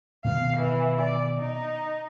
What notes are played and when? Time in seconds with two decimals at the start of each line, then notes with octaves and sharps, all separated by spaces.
0.25 B2 D#3 B3 F5
0.57 E3
1.01 D5
1.38 D#4